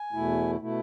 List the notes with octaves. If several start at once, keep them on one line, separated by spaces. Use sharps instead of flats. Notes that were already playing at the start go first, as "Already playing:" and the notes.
Already playing: G#5
E2 B2 A3 E4
B2 A3 E4